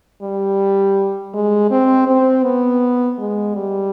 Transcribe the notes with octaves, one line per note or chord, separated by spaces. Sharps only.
G3
G#3
C4
C4
B3
G#3
G3